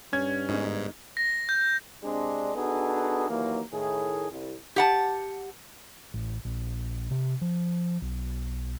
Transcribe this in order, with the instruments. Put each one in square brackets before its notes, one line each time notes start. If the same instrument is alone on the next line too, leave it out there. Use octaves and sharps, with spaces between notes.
[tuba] G2 [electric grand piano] C#4 G#6
[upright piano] G1 D#4 [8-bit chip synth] G#2
[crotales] A#6
G6
[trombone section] C3 G#3 C4 D4
B3 D4 D#4 F#4 G#4 A4
D#2 E3 F#3 A#3
A2 D#3 G#4
C2
[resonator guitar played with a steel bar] G4 F#5 A5
[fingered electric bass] A1
A#1
C3
F3
B1